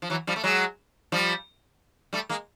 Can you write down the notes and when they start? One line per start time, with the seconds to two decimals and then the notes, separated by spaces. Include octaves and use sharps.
0.02 F3
0.10 E3 F#3
0.27 F3 G3
0.36 A3
0.44 F#3 G#3
1.12 F3 G3
2.13 G3 A3
2.29 G#3 A#3